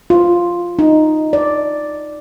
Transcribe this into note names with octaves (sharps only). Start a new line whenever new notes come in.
F4
D#4
D5